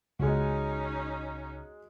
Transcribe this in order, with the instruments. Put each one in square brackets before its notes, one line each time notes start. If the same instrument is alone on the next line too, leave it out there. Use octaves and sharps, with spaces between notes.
[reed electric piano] C#2 [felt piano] G#3 F#4 [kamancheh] C#4 D#4